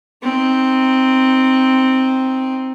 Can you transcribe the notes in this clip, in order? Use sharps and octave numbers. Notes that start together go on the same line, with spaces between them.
C4 D#4